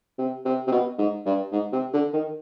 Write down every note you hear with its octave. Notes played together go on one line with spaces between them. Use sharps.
C3
C3
C3
B2
G#2
G2
G#2
C3
D3
D#3